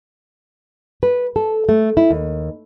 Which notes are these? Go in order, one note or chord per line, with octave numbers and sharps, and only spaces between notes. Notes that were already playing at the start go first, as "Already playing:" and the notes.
B4
A4
A3
E4
D#2